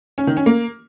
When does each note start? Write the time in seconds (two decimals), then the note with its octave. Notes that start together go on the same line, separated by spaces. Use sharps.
0.18 C#4
0.27 D#3
0.37 C#4
0.46 A#3